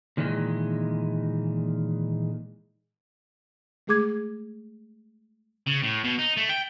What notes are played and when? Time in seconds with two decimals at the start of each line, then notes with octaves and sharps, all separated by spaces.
0.17 A#2 D#3 E3 F#3 G#3
3.87 G#3 A3 G#4 D6 G#6
5.67 C#3
5.83 A2
6.04 B2
6.19 D#4
6.37 A3
6.50 G5